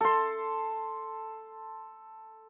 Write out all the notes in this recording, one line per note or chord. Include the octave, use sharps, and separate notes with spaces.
A4 C6